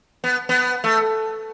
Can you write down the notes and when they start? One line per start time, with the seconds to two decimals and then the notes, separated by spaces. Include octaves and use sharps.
0.24 B3
0.49 B3
0.84 A3